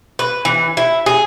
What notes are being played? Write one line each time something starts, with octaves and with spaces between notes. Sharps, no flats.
B4
E3
E4
G#4